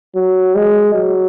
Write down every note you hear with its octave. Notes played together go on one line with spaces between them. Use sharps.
F#3
G#3
F#3